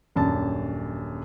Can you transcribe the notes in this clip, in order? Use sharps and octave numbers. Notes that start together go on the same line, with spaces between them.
D#1 F#2 D4 A5